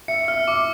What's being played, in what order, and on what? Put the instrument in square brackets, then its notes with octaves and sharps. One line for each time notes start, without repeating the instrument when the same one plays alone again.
[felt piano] E5 [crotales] C#7
[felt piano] E5 [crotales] F6
[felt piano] E5 [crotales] D6